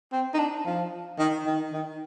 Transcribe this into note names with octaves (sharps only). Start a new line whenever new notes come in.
C4
D#4
D4
F3
D#3
D#3
D#3